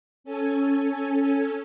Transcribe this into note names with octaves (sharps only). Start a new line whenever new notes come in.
C#4 A4 G#5